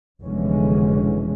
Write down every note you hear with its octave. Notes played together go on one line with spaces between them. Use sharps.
F1 B2 D3 E3 G#3 C#4